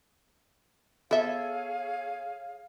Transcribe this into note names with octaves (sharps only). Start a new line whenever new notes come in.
B3 G#4 A4 C#5 E5 F5